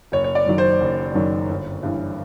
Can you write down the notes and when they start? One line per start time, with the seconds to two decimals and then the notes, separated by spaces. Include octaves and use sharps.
0.12 F#1 C#5
0.24 C#5
0.35 D5
0.46 F#2 D#3 F#3
0.58 C5
0.81 F#1
1.15 F#2 D#3 F#3
1.49 G1
1.83 G2 E3